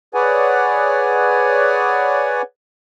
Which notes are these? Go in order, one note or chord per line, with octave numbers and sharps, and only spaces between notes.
G#4 B4 C#5 D5 F#5 G#5